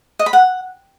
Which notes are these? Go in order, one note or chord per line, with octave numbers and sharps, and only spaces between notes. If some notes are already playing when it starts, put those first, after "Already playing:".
D#5
B5
F#5